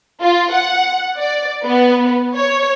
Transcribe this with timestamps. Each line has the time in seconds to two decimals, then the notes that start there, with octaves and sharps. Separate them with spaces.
0.21 F4
0.53 F#5
1.19 D5
1.65 B3
2.37 C#5